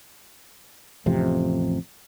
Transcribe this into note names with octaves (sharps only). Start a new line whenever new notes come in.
A1 F2 C3